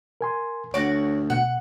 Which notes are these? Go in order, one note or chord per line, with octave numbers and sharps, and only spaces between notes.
A#4 G#5 C6
D2 F#4 C#5 D5 D6
B2 F#5